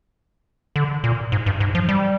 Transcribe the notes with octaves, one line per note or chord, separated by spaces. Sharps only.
D3
A#2
G#2
G2
G#2
F3
G3